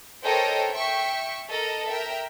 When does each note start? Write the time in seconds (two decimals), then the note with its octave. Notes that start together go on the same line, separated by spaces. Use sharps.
0.24 A4 A#4 C5 C#5 D#5 G5
0.71 E5 G5 C#6
1.50 A4 A#4 D#5
1.89 A#4 E5 G5